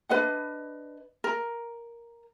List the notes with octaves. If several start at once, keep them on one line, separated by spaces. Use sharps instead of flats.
D4 B4 D#5 F#5
A#4